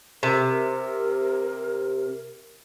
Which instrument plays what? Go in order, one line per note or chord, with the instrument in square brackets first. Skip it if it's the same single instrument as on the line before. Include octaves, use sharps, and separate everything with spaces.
[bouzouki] C3 [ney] A#4